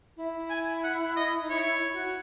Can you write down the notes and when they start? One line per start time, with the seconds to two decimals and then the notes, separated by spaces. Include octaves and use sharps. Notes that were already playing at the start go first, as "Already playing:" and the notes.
0.17 E4
0.50 G#5
0.84 F#5
1.16 D#5
1.41 D#4
1.49 E4 C#5
1.72 E4
1.94 F#4